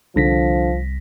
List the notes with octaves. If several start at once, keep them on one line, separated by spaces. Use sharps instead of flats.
C2 D3 F3 A#6 B6